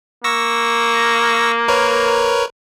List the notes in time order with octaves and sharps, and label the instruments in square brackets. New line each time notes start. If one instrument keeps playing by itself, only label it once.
[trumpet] A#3 [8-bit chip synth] C#6 E6 A#6
[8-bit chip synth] A#4 B4 C#5